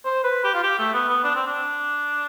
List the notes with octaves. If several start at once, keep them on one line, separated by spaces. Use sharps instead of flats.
C5
B4
G4
F4
G4
A3
B3
B3
D4
C4
D4